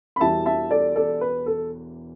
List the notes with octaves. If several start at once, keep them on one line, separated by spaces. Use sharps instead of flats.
B5
E1 E2 E3 G3 E5 A5
E5 A5
A4 D5
A4 D5
B4
A4